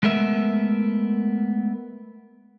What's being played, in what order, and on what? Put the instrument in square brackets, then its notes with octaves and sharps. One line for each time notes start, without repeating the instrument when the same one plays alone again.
[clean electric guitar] G#3 A3 B3 A#4 E5